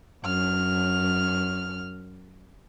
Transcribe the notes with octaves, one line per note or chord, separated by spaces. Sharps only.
F#2 F6